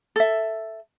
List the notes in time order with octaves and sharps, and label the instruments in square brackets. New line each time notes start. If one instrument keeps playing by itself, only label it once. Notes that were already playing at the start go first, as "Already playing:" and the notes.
[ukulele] A4 E5